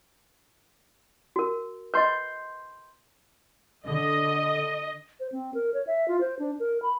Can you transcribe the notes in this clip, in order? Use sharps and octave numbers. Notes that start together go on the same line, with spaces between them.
F#4 A#4
B4 D#5 C6 G6
D3 D#5
C5
C4
A#4
C#5
E5
F4
C5
D4
A#4
B5